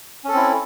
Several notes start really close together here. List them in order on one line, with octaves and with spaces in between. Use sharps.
C#4 A4 C4 E4